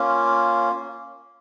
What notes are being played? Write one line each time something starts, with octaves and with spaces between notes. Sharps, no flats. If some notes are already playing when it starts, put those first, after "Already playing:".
Already playing: A#3 C#4 F4